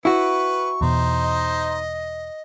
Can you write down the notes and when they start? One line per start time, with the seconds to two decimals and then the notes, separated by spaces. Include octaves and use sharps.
0.05 E4 F#4 B4 C#6
0.81 E2 B2 D#4 C5
1.22 D#5